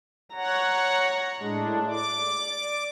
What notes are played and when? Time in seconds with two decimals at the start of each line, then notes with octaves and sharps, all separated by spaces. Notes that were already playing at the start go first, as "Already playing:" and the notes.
0.35 C#5 F#5 A#5
1.40 A2 G#3 D4
1.89 D5 D6